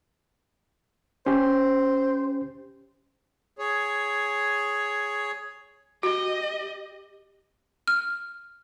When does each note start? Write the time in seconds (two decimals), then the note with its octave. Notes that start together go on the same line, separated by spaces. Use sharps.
1.26 C#4 G4 C5
3.59 G#4 C#5
6.03 F#4 G4 D#5
7.88 F6